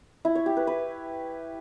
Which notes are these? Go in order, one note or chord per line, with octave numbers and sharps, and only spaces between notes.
E4
C#5
G4
B4
B4